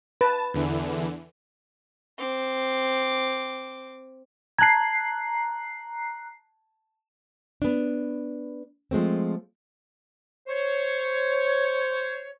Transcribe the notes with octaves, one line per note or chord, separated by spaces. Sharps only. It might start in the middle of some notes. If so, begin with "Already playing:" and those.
B4 A5
E2 D3 E3
C4 D6
A5 A#5 F#6 G#6 C7
B3 D4
F3 G#3 A3 C4
C5 C#5